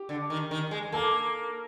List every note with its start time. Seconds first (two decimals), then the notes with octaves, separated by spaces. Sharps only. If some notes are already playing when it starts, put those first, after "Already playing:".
Already playing: G4
0.09 D3
0.30 D#3
0.51 D#3
0.71 G#3
0.92 A#3 A4